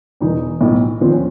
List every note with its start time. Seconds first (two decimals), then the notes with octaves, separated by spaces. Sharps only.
0.21 E1 E2 B2 D#4
0.61 B1 A2 E3
1.01 D#2 D3 F3 C4
1.12 C#4